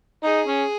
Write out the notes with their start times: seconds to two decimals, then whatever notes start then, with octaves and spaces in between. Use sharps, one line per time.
0.24 D#4 G#4
0.47 C#4